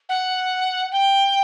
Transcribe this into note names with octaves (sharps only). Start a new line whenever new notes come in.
F#5
G5